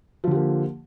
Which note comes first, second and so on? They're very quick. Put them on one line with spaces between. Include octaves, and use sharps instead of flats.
F3 D3 G4 A#3